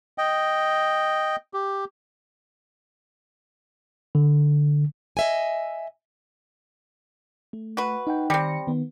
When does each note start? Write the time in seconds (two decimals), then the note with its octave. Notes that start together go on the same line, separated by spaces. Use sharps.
0.18 D#5 G5
1.54 G4
4.15 D3
5.17 D#5 E5 G#5
7.53 A3
7.77 F#4 B4
8.07 D#4 F#5 G5
8.30 D#3 G3 C4 A#6 C#7
8.67 D#3 B3